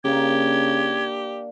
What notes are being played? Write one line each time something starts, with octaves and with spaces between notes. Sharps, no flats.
C#3 A#3 D4 G4 G#6